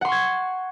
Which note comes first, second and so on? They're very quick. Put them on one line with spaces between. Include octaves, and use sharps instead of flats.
F#5 C6 C#6 G#6